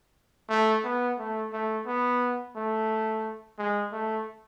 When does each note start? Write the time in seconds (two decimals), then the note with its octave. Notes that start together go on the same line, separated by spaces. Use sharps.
0.49 A3
0.84 B3
1.19 A3
1.53 A3
1.87 B3
2.56 A3
3.59 G#3
3.92 A3